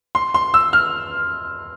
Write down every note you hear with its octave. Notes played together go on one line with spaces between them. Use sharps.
C6
C6
E6
F6